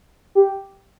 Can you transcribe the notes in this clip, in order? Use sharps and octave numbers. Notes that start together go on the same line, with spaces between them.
G4